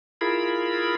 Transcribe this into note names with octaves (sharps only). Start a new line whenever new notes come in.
E4 F4 G#4 A#4 B5